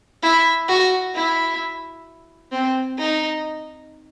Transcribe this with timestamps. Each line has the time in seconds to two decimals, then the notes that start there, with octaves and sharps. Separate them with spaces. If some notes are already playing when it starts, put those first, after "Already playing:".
0.23 E4
0.68 F#4
1.14 E4
2.52 C4
2.98 D#4